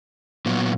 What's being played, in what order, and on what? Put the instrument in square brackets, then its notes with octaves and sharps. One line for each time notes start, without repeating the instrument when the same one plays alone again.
[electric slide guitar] A#2 F#3 B3